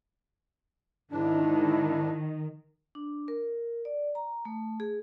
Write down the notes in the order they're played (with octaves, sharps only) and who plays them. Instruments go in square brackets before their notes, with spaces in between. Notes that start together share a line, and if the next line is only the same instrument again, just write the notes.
[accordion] G#2 D4 [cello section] D#3 [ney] E4
[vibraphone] D4
A#4
D5
A#5
A3
G#4